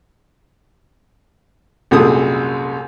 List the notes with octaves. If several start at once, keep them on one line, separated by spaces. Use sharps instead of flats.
C2 F#2 A#2 G#3 A4 D#6